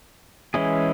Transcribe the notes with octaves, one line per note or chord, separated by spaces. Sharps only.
E3 G#3 C#4 E4 G#4